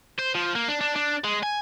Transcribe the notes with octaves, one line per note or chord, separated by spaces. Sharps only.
C5
F3
A#3
D4
D4
D4
G#3
G#5